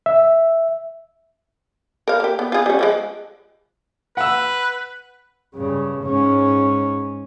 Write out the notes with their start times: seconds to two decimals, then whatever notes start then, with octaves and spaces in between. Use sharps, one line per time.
0.06 E5
2.08 A#4 F5
2.20 A#3 G4
2.39 B3
2.52 F4 G#4
2.66 G3 C#4
2.79 F3 G3 G#3
4.17 B4 F#5 E6
5.55 G2 C#3
6.02 G#2 C#4